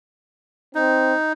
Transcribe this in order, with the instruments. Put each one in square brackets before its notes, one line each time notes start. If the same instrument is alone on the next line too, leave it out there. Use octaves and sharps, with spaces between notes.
[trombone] C4 [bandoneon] D#4